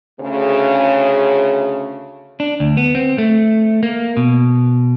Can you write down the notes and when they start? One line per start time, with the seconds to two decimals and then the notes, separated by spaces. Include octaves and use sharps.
0.21 D2 C#3
2.40 D4
2.60 D2
2.77 B3
2.95 C4
3.18 A3
3.83 A#3
4.17 B2